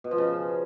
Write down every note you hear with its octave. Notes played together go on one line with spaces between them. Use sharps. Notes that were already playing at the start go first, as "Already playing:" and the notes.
B2
F3
C#3